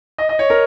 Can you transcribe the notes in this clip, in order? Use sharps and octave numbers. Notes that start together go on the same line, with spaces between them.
D#5
D#5
C#5
A#4